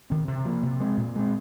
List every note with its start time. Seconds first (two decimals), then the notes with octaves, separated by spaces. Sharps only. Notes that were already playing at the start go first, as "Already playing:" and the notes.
0.10 D#3 C4
0.28 C3
0.45 F3 A#3
0.63 C3
0.80 G#3 C4
0.97 A#2
1.16 G#3 C4